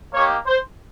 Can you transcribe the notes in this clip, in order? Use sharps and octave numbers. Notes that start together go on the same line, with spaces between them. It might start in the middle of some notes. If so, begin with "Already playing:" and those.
A#3 D#4 G4 C#5
C5